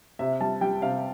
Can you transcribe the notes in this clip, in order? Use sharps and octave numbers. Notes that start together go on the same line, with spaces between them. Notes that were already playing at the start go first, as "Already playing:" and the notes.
C3 E5
G3 A5
G3 G5
C3 F5